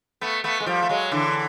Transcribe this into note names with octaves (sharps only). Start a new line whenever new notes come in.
A3 B3
A3 B3
G#3
F3 G3
A3
F#3 G#3
D3 E3